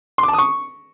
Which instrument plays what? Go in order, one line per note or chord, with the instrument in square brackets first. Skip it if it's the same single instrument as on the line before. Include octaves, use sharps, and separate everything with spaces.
[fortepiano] C6
D6
A5
D#6
C#6